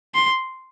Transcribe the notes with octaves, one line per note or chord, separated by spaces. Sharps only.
C6